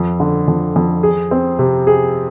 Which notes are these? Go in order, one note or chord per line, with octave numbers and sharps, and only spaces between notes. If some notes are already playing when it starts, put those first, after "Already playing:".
Already playing: F2
D3
F2
F2
G#4
C4
C3
G#4